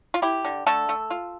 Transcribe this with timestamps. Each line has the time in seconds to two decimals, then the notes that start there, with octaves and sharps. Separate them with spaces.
0.14 F4
0.22 E4 G4
0.45 D3
0.66 D3 A3 A4
0.89 A3
1.10 F4